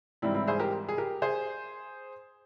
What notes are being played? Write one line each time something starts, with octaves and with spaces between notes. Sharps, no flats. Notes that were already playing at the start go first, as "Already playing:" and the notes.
G#2 E3 G3 C4 E4
C4 E4
G#4 C5
G4 A#4
G#4
G4 A#4
G#4 C5